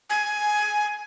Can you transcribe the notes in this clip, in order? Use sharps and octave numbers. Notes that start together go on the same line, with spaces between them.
G#5